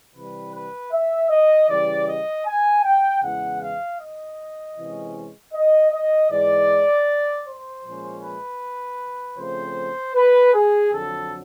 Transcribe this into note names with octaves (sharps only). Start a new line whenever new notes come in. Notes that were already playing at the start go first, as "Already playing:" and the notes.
C3 E3 G3 B4
B4
E5
D#5
C#3 E3 G3 D5
D#5
G#5
G5
E2 C#3 E3 G#3 F#5
F5
D#5
C3 E3 G#3 C#4
D#5
D#5
G#2 E3 G#3 D5
C5
A#2 F3 G#3 C#4
B4
C#3 F3 A3 C4 C5
B4
G#4
F2 D3 F#3 A4